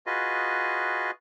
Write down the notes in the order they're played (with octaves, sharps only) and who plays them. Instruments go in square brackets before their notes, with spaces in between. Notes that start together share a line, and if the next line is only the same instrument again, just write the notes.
[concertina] F4 F#4 G#4 B4 D#5